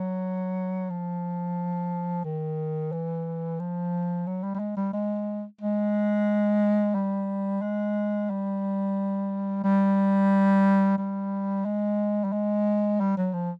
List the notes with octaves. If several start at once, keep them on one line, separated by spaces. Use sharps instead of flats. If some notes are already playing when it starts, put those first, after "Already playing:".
Already playing: F#3
F3
D#3
E3
F3
F#3
G3
G3
G#3
G3
G#3
G#3
G3
G#3
G3
G3
G3
G#3
G3
G#3
G3
F#3
F3